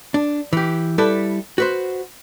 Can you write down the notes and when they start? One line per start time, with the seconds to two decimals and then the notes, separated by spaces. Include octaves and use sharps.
0.14 D4
0.53 E3 G4
0.98 G3 E4 A4 B4
1.58 F#4 B4 C5